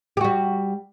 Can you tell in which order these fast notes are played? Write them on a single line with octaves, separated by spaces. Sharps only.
G4 F#4 G3